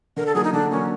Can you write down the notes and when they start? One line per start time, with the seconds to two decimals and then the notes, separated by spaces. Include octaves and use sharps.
0.16 D3 A#4
0.26 A4
0.35 F#3 A#3 G#4
0.44 D#4
0.53 D3 D4
0.71 F#3 A#3 C#4